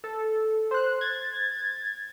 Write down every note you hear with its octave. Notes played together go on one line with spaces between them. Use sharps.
A4
C5 F#6
G#6 A6